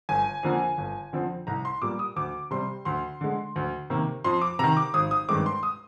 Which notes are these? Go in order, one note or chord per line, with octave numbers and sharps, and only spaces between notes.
G1 G#5
F2 D3 F3 A#3
G1
F2 D3 F3 C4
C2 A#5
C6
A#2 G3 A#3 D6
D#6
D2 D6
C3 G3 C4 C6
D2 C6
D3 G#3
D2
C3 D#3 A#3
F2 C6
D6
C3 D#3 A#5
D6
G#1 D#6
D#6
G2 D#3 G#3 C4 D6
C6
D#6